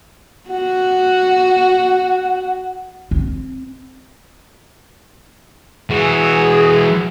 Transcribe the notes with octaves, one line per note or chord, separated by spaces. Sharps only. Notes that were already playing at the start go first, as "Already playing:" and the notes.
F#4 F#5
C4
E3 F#4 G#4